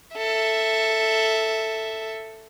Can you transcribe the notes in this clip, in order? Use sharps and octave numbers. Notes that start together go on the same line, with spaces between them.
A4 E5